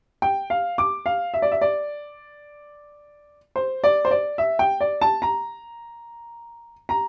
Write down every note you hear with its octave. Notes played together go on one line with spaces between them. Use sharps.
G5
F5
D6
F5
E5
D5
E5
D5
C5
D5
C5
D5
E5
G5
D5
A5
A#5
A#5